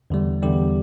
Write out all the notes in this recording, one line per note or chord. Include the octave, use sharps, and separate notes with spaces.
E2 D3 G3
E2 D3 G3 G4